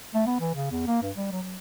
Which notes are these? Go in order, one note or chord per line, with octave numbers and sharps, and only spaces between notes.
A3
B3
E3
C#3
E2
A#3
G2
G3
F#3
F#3